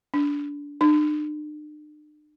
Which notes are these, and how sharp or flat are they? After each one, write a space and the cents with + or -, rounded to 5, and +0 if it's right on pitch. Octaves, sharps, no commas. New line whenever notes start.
D4 -20
D4 +45